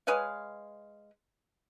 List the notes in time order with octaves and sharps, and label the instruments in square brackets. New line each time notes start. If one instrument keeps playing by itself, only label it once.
[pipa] G#3 B4 C#5 F5